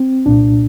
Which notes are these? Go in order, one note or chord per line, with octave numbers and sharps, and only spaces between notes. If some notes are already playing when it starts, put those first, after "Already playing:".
Already playing: C4
C2 A#2 D4